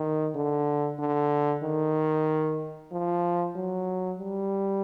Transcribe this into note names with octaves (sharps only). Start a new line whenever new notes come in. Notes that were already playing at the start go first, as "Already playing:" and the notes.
Already playing: D#3
D3
D3
D#3
F3
F#3
G3